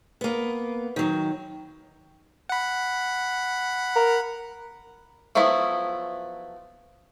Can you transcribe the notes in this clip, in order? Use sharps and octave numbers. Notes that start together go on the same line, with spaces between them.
A#3 B3
D#3 F#3
F#5 B5
A#4
F3 F#3 A3 B3 E4